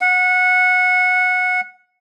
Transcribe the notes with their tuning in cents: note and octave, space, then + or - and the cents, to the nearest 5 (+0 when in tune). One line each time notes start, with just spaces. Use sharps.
F#5 -15